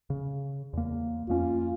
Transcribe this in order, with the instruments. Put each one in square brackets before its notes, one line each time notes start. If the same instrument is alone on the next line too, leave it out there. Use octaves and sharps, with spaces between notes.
[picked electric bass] C#3
E2 A#3
[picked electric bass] F2 A#3 C#4 [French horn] F4